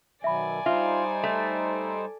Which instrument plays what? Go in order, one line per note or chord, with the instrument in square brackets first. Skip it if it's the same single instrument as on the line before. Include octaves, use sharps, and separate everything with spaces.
[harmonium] B2 D#3 F#3 [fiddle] D5 G#5 [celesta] E5 B5
[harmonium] G3 D#4 C5 [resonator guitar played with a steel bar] F4 [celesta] E5
[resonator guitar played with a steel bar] A3